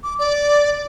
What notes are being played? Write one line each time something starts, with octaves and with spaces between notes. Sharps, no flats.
D6
D5